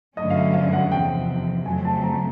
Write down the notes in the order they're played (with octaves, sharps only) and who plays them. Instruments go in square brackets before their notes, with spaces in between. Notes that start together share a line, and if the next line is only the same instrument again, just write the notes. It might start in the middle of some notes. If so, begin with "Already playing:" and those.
[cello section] G2 D3 F#3 A3 C#4 [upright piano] D#5
[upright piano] F5
E5
F5
F#5
[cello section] E2 C3 F3 [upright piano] G5
[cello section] F2 C#3 F#3 A3 C4 [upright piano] G#5
[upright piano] A5
A#5